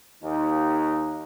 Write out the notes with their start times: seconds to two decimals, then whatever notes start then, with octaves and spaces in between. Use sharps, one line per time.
0.23 D#2 D#4